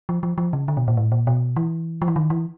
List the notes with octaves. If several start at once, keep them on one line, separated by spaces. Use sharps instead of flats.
F3
F3
F3
C#3
D3
B2
A#2
A2
A#2
B2
E3
F3
E3
D#3
E3